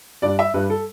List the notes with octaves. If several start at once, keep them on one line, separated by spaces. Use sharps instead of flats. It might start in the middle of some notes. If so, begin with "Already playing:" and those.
G2 G3 D5
E5
G2 G3 B4
A4